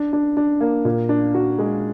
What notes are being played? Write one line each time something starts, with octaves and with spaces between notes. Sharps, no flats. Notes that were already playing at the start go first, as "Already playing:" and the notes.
Already playing: D4
D4
D4
A#3
A#2
D4
F#4
G#3